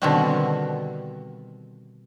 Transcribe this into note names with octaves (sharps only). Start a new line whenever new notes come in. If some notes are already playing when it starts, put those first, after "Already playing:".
B2 D3 D#3 G3 C4 F#4